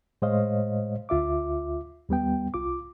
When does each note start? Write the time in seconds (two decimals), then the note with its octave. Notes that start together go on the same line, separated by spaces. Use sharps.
0.22 A2 G#3 C5 C#5 D#5 F5
1.09 D2 F4 E5 D6
2.09 D#2 G3 B3 G5
2.54 C2 F4 D6